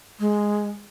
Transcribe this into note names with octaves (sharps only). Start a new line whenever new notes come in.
G#3